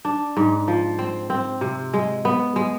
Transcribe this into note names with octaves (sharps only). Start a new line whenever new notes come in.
D4
G#2
F3
C4
C4
C3
G#3
B3
G#3